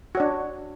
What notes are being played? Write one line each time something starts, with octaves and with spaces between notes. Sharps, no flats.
D4 F#4 C#5